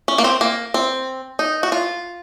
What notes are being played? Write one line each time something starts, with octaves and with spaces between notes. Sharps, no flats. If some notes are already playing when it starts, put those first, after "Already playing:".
C#4
A#3
C4
A#3
C4
D#4
F#4
F4